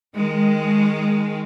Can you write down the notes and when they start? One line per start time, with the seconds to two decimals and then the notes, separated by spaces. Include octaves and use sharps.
0.14 D#3 G#3